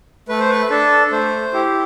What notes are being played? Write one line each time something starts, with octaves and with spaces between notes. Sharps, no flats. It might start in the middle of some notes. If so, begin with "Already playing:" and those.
A3 B4
C5
B4
D4 A4
A3 C5
E4 G4